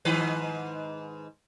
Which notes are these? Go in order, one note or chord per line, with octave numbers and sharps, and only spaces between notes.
G#2 D#3 B4